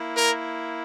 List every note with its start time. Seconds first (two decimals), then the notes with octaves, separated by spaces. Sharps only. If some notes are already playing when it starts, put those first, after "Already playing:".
Already playing: A#3 E4
0.17 A#4